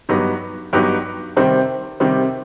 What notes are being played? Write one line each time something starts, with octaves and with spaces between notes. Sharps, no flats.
G2 F#3 B3 D#4 G4
G2 F#3 B3 D#4 G4
C3 D#3 G3 C4
C3 D#3 G3 C4